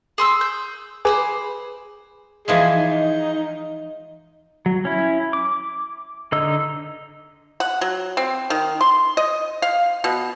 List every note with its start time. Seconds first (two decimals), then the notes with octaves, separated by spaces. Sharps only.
0.18 G#4 C6 E6
0.41 G6
1.05 G#4 B4 C5 G#5 B5 D6
2.48 E3 F3 G#3 G#4
2.76 D#4
4.66 F#3
4.85 C#4 E4
5.33 D6
6.32 D3 D#4 D#5 E6
7.60 F#5
7.81 F#3
8.17 C4
8.50 D#3
8.81 C6
9.17 D#5
9.62 F5
10.04 B2